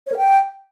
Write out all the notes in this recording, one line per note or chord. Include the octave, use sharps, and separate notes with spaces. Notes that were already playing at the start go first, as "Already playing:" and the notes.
C#5
A#4
G5